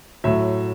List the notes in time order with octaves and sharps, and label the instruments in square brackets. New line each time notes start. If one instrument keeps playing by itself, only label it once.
[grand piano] A2 F#3 E5